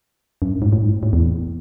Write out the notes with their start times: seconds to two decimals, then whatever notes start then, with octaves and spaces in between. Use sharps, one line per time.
0.42 F#2
0.52 G2
0.62 G#2
0.73 A2
0.83 G#2
1.03 A2
1.13 E2